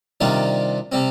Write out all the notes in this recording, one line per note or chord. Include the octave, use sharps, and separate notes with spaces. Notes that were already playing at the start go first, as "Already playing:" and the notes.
C3 D#3 G3 D4 F4
C3 G3 C4